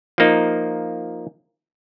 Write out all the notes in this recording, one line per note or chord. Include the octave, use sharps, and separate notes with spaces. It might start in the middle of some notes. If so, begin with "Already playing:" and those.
F3 A#3 D#4